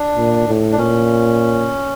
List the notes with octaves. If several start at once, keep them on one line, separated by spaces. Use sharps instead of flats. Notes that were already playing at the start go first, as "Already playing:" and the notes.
Already playing: D4
A#2
A2
D4
A#2 C#4